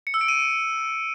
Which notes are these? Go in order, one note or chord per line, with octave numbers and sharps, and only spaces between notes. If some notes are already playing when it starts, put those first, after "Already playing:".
C#7
E6
D7
D#7